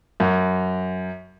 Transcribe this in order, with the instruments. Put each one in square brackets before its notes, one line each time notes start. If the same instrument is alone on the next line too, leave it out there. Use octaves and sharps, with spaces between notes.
[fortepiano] F#2